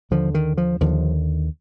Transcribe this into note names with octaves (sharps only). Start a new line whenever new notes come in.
D#2 D3 F3
D#3
F3
D#2 D3 F3